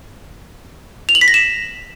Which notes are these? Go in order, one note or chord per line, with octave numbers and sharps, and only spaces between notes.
F7
F#7
B6
A#6
E7